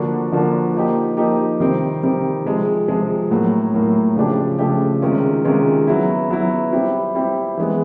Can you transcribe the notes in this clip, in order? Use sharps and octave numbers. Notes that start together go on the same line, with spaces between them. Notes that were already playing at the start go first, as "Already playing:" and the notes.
Already playing: D3 F3 A#3 D4 F#4
D3 F3 A#3 D4 F#4
F3 A#3 D#4 G4
F3 A#3 D#4 G4
C3 D#3 G3 C4
C3 D#3 G3 C4
C3 F3 G#3
C3 F3 G#3
A2 F#3 A#3
A2 F#3 A#3
C#3 F3 A3 D4 G4
C#3 F3 A3 D4 G4
C3 D#3 G#3 C#4 F4
C3 D#3 G#3 C#4 F4
F#3 B3 E4
F#3 B3 E4
G3 C4 E4
G3 C4 E4
E3 G#3 B3